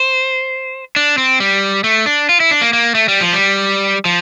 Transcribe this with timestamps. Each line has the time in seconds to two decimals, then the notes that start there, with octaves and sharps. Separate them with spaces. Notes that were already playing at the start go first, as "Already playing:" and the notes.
Already playing: C5
0.96 D4
1.18 C4
1.40 G3
1.84 A3
2.06 D4
2.29 F4
2.40 E4
2.51 D4
2.61 A#3
2.73 A#3
2.95 A3
3.08 G3
3.21 F3
3.33 G3
4.05 F3